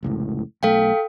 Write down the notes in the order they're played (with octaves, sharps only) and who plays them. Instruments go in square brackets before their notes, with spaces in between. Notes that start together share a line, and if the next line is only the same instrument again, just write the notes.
[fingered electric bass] F1 C#2 A2
[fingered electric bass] B1 A3 [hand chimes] A4 F5 G5